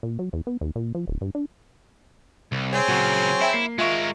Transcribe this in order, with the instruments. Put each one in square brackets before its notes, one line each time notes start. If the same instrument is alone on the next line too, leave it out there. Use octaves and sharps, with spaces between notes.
[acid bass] A#2
F#3
E2
B3
D#2
A#2
F3
D1
G2
D4
[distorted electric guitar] C2
[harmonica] C4 G#4 C#5
[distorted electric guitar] A#2 C#3 [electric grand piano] F#3 F#5 C#6
[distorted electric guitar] E4 [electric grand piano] E5 G5
[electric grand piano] A#3 C7
[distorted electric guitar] G#3 A#4 [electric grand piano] F4 E5 C#6